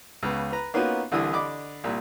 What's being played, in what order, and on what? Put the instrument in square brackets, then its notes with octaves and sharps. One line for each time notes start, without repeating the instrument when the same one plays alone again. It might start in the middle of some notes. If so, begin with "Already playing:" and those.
[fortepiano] C#2 C#3 B3
B4 A#5
A#3 B3 C#4 D#4 F4 F#4
C2 D3 E3 D#6
D3 D#5 B5 D6
C2 A#2